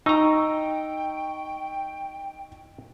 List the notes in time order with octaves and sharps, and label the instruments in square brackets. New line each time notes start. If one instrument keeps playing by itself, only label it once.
[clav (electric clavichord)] D#4 A#5 [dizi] G5 [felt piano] C#6 E6